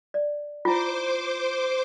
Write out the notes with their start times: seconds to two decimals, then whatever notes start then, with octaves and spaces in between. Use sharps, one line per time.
0.14 D5
0.65 E4 F4 C5 D6